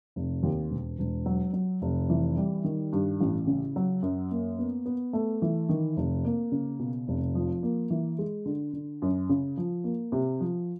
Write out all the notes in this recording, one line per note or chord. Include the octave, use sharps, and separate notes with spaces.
F1
D#2
E1
E1
F#3
F#3
F1
E3
G3
D#3
G2
A1
C#3
F#3
F#2
A#3
B3
B3
A3
E3
D#3
F1
A#3
C#3
B2
F1
F3
A#3
E3
G#3
D3
D3
F#2
C#3
F3
A#3
C3
F3